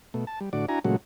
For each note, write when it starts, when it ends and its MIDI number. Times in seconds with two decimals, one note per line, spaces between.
0.14 0.25 47
0.14 0.25 57
0.27 0.39 81
0.40 0.49 55
0.53 0.66 45
0.53 0.66 50
0.53 0.66 66
0.53 0.66 74
0.69 0.79 62
0.69 0.79 64
0.69 0.79 66
0.69 0.79 80
0.69 0.79 82
0.84 0.96 46
0.84 0.96 49
0.84 0.96 54
0.84 0.96 56
0.84 0.96 57
0.84 0.96 66